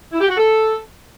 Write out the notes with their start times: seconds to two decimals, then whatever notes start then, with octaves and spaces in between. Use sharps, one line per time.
0.13 E4
0.21 G4
0.29 F#4
0.37 A4